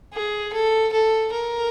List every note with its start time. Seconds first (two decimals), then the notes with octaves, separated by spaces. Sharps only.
0.14 G#4
0.53 A4
0.93 A4
1.32 A#4